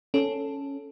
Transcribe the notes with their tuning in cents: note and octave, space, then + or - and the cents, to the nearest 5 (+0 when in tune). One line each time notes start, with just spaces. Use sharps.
C#4 +0 A4 +0